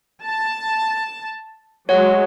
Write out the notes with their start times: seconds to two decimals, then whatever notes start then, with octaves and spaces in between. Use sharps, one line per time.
0.25 A5
1.89 F#3 G#3 C#5 F#5